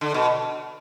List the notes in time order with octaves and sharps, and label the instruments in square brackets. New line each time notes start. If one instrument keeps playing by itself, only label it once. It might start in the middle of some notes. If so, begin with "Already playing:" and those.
[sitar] D3
B2